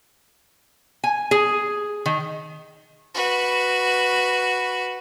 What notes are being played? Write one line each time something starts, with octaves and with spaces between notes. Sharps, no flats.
G#5
G#4
D#3
F#4 B4